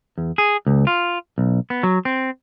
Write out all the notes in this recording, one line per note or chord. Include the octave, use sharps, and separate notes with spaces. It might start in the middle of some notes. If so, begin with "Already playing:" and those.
E2
G#4
C#2
F4
B1
B3
F#3
C4